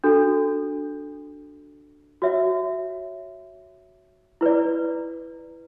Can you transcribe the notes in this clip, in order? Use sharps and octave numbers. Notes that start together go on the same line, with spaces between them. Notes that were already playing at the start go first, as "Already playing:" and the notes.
D4 F#4 A4
F#4 C#5 E5
E4 B4 D5